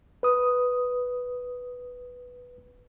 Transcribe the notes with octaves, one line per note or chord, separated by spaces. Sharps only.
B4 D#6